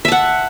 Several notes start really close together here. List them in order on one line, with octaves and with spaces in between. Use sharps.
E5 A5 F#5